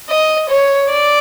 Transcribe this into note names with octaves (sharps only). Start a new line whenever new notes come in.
D#5
C#5
D5